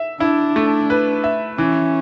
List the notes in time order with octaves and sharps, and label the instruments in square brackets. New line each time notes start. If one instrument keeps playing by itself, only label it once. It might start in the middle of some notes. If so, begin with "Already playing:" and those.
Already playing: [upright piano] E5
[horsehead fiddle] D4 [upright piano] E4
[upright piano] A3
B4
E5
[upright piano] E3 [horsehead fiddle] C#4